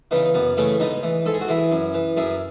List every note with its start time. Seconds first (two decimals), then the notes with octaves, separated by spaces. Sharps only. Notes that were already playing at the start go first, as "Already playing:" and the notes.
0.11 C#3 E3 B3 D#4
0.34 F#2 B3
0.57 C#3 E3 A3 C#4
0.80 G#2 B3 D#4
1.03 E3
1.25 G#2 A4
1.34 G#4
1.41 F#4
1.48 E3 E4 G#4
1.72 F#2
1.94 E3
2.17 F#2 E4 G#4